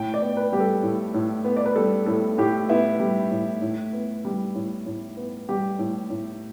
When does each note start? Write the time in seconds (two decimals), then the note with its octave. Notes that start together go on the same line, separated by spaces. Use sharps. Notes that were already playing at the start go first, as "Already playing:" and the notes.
Already playing: A2 G5
0.14 D5
0.21 B3
0.37 B4
0.53 G3 G4
0.60 A4
0.83 A2
1.14 A2
1.44 B3
1.57 D5
1.66 B4
1.76 G3 A4
2.06 A2 A4
2.38 A2 G4
2.69 B3 E4
3.00 G3
3.31 A2
3.62 A2
3.93 B3
4.25 G3
4.55 A2
4.86 A2
5.17 B3
5.49 G3 G4
5.79 A2
6.10 A2